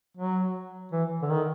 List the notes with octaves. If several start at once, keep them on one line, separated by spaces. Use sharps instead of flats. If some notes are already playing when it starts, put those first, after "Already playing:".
F#3
E3
D3
D#3